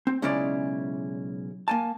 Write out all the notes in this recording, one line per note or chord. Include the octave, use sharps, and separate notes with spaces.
C4
B1 C#3 G#3 C#4 E4 D5
A#3 G#5 A5